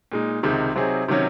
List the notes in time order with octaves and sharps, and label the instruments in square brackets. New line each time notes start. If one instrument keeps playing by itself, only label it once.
[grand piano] A#2 G#3 D#4
C#2 C3 D#3 G#3
C3 F#3 C4 D#4 G#4
C3 D#3 F#3 C#4